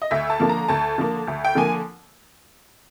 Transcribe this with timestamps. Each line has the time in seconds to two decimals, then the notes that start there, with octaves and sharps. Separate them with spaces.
0.02 D#5
0.11 D2 E5
0.30 A5
0.40 D3 F3 A#3
0.49 A#5
0.68 D2 A5
0.98 D3 F3 A#3
1.27 D2
1.44 G5
1.55 D3 F3 A#3 G#5